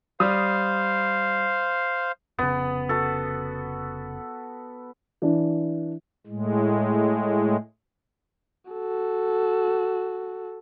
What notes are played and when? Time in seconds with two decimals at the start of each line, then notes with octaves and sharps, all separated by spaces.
0.20 G3 C5 F5 D#6
2.39 F1 C#3 B3
2.89 F#4 A4
5.22 E3 D4
6.27 A2 G#3
8.71 F#4 A4